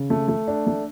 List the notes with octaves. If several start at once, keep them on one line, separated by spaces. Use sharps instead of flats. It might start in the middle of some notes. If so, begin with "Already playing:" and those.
Already playing: C#3
A3
A3
D4
A3